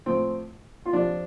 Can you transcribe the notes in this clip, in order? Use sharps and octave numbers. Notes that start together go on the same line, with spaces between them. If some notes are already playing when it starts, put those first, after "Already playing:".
A2 F3 C4
F4
F2 C3 F3 D4